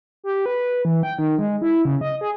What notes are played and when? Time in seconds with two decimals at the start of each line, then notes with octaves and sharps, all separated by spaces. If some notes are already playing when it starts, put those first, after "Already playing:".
0.24 G4
0.46 B4
0.85 E3
1.03 G5
1.18 D#3
1.38 G#3
1.62 E4
1.85 C#3
2.01 D#5
2.21 G#4